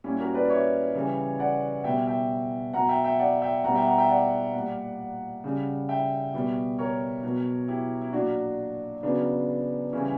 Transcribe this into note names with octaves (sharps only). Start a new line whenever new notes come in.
A#2 G3 C#4 E4
F#4 A#4
B4 D5
D5
C#5 E5
C#3 E3 G3
D5 F#5
B2 G3 E5 G5
E5 G5
B2 F#3 F#5 A#5
E5 G5
E5 G5
D5 F#5
E5 G5
B2 G3 F#5 A#5
E5 G5
F#5 A#5
E5 G5
D5 F#5
A#2 G3
C#3 G3
E5 G5
B2 G3
A#4 C#5
B2 F#3
E4 G4
E4
A#2 F#3 D4 F#4
C#3 F#3 B3 D4
C#3 E3 G3 C#4 E4